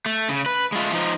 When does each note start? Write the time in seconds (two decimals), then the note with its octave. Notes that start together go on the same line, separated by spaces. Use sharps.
0.06 A3
0.29 C#3
0.46 B4
0.72 G#3 A3 F4
0.93 F3 D#4